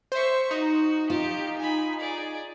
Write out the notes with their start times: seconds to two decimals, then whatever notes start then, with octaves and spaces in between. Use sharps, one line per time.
0.12 C5 E5 C#6
0.51 D#4 F#4
1.10 F4 G4
1.58 G#5 B5
1.99 G#4 D5